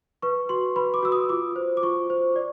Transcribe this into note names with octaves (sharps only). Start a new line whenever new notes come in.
B4 C#6
F#4 C6
B4 B5
D6
F#4 E6
D#6
F4 D6
C5
D6
F4 C#6
C5
D5